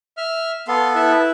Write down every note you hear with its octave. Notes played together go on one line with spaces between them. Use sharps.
E5 F6
B3 A4 F5 C6
E4 B4 E5